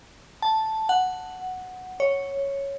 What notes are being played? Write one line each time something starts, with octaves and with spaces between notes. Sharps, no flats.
A5
F#5
C#5